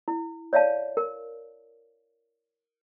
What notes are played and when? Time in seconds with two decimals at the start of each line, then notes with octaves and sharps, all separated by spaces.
0.08 E4
0.53 C#5 D5 E5 F5 A5
0.97 A#4